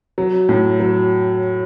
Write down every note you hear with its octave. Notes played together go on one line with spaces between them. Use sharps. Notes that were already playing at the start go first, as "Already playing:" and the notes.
F#3
A2
F#3